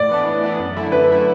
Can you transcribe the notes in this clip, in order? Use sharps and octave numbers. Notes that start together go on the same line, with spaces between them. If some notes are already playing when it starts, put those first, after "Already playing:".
Already playing: A2 D5
E3 B3 D4
A2
E3 B3 D4
F#2
D3 A3 E4
F#2 B4
D3 A3 E4